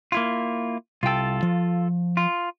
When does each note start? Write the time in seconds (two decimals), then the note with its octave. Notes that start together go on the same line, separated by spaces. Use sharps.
0.12 A#3 E4 F4
1.03 C2 F4 A4 G5
1.43 F3
2.17 F4